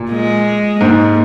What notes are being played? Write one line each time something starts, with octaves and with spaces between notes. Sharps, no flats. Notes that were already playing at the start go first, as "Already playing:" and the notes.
Already playing: A#2
G#3
G#2 A#3